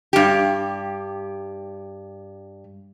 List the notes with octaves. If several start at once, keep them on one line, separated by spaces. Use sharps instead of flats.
G2 G4